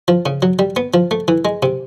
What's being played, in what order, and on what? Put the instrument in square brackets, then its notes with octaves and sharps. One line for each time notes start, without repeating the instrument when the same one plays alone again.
[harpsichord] F3
C#3
F#3
G3
B3
F3
A3
E3
G#3
C3